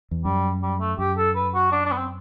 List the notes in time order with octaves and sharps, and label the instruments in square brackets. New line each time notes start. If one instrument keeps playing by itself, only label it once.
[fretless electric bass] E2
[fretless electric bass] F#2 [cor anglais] G3
[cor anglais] G3
A3
[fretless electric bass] F#2 [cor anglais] G4
[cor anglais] A4
B4
F#4
D4
D4
B3
C4